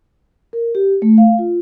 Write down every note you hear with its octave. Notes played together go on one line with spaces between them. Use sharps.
A#4
G4
A3
F5
F4